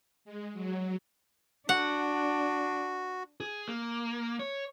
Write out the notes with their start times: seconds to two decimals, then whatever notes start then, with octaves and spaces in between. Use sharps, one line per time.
0.25 G#3
0.53 F#3
1.69 D4 F#4 F#5
3.40 G#4
3.68 A#3
4.40 C#5